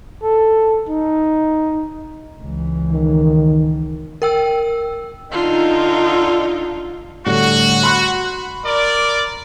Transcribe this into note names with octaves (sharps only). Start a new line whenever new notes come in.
A4
D#4
C#2 E3
D#3
A#4 G5 E6
D3 D#4 F4
A2 D3 G3 F#4
B5 C6 F#6
A#4 D5